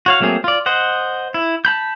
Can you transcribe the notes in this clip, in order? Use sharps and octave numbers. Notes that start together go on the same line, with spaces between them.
F#4 C#5 F5
F#3 A3 A#3 C4 G#4
F4 D5
C5 D#5 F#5
E4
A5 B5 G6